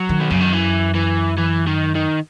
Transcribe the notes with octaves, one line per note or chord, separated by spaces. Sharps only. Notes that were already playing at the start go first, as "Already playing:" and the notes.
Already playing: F#3
D#3
B2
F#2 C#3
D#3
E3
E3
E3
D#3
D#3